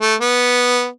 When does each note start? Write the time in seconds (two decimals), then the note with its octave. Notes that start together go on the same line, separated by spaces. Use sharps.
0.01 A3
0.20 B3